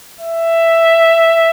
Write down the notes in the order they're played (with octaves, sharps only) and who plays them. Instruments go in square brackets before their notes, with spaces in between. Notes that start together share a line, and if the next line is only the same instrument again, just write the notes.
[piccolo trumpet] E5